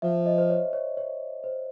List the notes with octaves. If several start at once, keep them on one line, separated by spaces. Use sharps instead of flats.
F3 E5
D#5
C5
C#5
C#5
C#5
C5